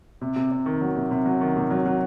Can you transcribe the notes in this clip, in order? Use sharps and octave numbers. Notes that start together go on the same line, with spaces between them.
C3
C3
C3
D#3
F#3
C3
C3
F#3
D#3
C3
F#3
F#3